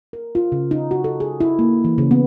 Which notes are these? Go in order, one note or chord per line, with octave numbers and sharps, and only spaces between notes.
A#4
F4
C#3
D#4
F#4
A4
G#4
E4
A#3
E3
C#3
B3